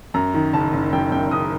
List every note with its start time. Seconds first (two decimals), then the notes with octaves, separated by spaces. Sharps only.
0.14 F#2 A#5
0.34 D#3
0.53 F#1 A5
0.73 F#1
0.93 F#2 G5
1.12 F#2 G5
1.31 F#1 D#6